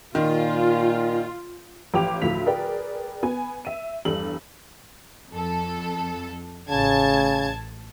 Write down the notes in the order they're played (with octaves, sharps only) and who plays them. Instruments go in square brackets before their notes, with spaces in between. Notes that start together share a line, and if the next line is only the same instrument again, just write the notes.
[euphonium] A#2 [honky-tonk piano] D#3 [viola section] F4
[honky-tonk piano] A1 F3 G4 G5 D6 F7
D2 A2 F3 B6 F7
G#4 A#4 B4 D5 G5
B3 G#5
E5 D#7
E2 G2 G3 A4 F#7
[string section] F2 A4
[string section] A1 A5 G#6 [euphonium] C#3